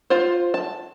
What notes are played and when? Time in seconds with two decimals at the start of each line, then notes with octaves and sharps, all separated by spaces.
0.10 F4 C5
0.54 A5